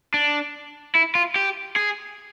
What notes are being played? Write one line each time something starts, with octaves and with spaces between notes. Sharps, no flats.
D4
E4
F4
G4
G#4